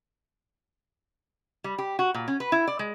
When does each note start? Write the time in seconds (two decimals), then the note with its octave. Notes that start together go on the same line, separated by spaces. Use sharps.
1.64 G3
1.78 G4
1.99 F#4
2.14 A#2
2.28 C#4
2.40 B4
2.52 E4
2.68 D5
2.79 G#3